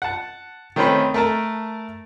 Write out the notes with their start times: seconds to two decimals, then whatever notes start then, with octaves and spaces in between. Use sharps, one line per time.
0.02 F#5 A5
0.76 D#3 A3 C4 C#4 B4
1.14 A3 A#4 A5